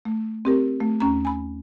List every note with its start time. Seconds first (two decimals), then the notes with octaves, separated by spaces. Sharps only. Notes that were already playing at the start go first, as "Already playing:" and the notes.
0.05 A3
0.45 C4 G4 A#4
0.80 A3
1.00 D#2 C#4 A#5
1.25 G#5 B5